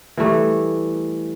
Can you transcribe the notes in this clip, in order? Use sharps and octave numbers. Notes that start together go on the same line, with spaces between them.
E3 G3 A3